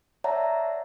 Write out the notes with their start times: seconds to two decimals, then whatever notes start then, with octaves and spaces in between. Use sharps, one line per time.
0.24 C#5 D5 E5 F#5 A5 A#5